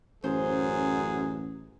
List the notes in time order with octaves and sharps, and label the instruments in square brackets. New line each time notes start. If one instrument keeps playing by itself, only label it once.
[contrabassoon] A1 [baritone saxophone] F#2 [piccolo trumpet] G#4 [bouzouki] C5